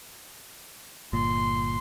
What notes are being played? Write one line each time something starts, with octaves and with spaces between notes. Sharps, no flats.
G1 A#2 C6